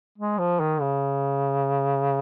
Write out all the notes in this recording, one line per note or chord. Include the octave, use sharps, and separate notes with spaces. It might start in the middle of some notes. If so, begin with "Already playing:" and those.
G#3
F3
D#3
C#3